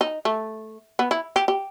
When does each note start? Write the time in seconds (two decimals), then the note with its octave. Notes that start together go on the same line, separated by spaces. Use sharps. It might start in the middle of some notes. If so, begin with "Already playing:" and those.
0.01 D#4
0.25 A3
0.99 B3
1.11 E4
1.36 G4
1.48 G4